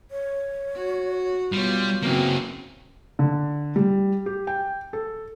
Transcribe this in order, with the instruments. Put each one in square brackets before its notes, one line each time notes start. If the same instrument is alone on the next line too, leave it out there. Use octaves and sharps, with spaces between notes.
[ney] C#5
[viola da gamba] F#4
[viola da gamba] B2 F4 C#5 [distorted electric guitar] G3
[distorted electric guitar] C#3 A#3 [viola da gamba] E3 F#3 C#4 [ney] C4
[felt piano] D3
G3
G4
G5
A4